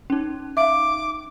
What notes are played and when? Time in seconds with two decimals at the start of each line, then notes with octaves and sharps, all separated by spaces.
0.10 C#4 D#4
0.57 E5 F5 D6